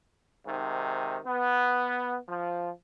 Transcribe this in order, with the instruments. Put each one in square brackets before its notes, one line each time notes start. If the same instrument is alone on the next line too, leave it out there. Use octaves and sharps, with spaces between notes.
[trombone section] G#2 C3 D#3
B3
F3